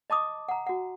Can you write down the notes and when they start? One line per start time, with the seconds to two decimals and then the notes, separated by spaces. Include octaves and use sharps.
0.10 D#5 A5 D6 D#6
0.49 F#5 A#5
0.67 F#4 F#5